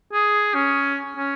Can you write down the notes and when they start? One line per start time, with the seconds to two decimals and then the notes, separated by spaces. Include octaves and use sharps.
0.13 G#4
0.55 C#4
1.16 C#4